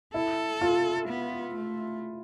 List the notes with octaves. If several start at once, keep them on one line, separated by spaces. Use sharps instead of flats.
E4 A4
F4
B3
A3